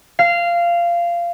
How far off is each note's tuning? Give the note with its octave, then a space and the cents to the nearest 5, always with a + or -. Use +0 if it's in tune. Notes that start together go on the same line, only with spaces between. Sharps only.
F5 -15